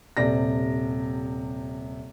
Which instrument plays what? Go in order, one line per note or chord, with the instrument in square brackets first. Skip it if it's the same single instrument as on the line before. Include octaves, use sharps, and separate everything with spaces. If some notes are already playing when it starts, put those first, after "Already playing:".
[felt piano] D#1 C3 D5 A#6